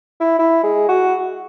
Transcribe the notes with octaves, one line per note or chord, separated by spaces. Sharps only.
E4
E4
G#3
F#4